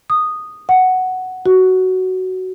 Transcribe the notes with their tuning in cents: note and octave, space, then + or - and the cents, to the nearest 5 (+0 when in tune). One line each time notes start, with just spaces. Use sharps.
D#6 -10
F#5 +5
F#4 +10